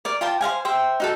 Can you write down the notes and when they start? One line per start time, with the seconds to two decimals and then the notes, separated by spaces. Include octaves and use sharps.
0.05 A#4 D5
0.21 F4 A#4 G5 A5
0.41 C5 D#5 F5 G#5
0.65 C5 E5 G5
1.00 D#4 F#4 A4